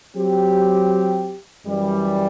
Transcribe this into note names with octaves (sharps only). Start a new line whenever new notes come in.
F#3 C4 G4
F#2 E3 G3